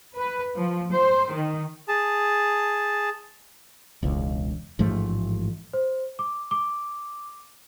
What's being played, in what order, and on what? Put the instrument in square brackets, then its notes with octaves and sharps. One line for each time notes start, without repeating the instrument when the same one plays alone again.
[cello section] B4
F3
C5
D#3
[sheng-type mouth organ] G#4 A5
[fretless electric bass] E1 C#2
A1 G#2 F3 A3
[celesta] C5
D6
D6